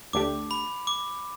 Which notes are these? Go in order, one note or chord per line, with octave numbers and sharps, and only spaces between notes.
D2 D3 A3 D4 G4 D6
B5
D6